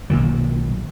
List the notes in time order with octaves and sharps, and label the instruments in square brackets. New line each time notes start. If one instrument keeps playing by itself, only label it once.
[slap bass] B1 A#2 D#3 F#3